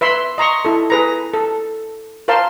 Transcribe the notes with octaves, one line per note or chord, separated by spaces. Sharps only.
B4 E5 B5 C6
D#5 A#5 C6 C#6
E4 A4
G#4 B4 A#5
A4
A#4 C5 F5 A5 C6